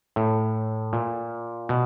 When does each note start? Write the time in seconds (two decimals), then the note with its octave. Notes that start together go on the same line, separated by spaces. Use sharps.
0.16 A2
0.93 A#2
1.69 B2